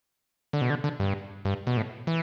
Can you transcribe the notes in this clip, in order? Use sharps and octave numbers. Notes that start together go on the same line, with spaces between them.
D3
B2
D3
D3
G2
G2
B2
A2
E3